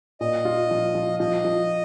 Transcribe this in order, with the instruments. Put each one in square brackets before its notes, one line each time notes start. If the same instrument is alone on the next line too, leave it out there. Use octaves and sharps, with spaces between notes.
[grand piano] A#2 [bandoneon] D#5
[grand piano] F4
F3
F3
[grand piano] F3 [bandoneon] D#5
[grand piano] F3